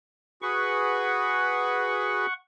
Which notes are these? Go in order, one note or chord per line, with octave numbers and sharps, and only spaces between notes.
F#4 G#4 B4 F#5 C#6